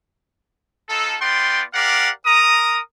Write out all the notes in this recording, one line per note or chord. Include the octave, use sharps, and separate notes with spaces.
D#4 F4 A4
B3 F4 D5 G5 C6
G4 A#4 D5 F5 F#5
A#4 A#5 D#6